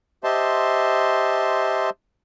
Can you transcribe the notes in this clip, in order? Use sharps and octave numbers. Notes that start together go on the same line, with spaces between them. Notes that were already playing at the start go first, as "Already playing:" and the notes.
G4 C5 D#5 E5 A5 C6